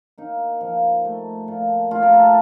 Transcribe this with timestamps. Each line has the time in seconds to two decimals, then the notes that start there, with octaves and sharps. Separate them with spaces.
0.18 A#3 D#4
0.61 F3
1.05 A3
1.48 A#2
1.91 A3 F4
2.03 A#4
2.13 A4